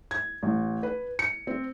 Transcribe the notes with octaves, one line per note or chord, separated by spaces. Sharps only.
G#6
A1
B4
C#7
C4